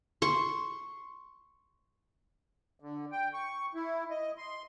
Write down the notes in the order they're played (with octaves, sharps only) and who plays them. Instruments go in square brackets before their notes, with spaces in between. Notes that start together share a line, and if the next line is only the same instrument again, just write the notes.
[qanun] C6 C#6
[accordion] D3
G5
C#6
E4
D#5
C6